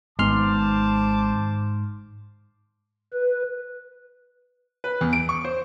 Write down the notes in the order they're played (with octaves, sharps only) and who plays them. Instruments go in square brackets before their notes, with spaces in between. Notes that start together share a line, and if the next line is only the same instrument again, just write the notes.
[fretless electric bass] G#1 B3 [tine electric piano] G#2 C6 F6 [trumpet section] C5 A5 D6
[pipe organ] B4
[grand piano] B4
E2
D7
C#6
C5